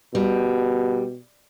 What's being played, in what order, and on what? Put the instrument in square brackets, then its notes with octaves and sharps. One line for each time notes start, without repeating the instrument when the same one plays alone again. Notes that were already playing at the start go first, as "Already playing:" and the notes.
[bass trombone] B2 [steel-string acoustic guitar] G3